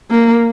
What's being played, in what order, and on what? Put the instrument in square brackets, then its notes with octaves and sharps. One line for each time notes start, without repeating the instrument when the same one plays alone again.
[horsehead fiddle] A#3